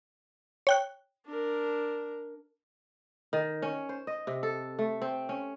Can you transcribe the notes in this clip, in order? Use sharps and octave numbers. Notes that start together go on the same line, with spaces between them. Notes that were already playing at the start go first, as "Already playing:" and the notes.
C#5 G5 F#6
D4 A#4
D#3
C#4
C5
D#5
C3
A4
A3
C4
C#4